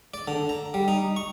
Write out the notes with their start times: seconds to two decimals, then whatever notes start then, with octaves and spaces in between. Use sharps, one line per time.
0.14 D5
0.28 D3
0.49 A#5
0.74 G3
0.88 D#4
1.16 C#6